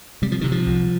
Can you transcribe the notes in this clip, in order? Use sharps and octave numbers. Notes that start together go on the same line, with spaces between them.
C3 G3
F3
C3 D#3
F3
C2